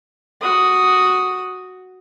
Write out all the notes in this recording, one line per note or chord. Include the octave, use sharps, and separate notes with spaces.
F#4 D#6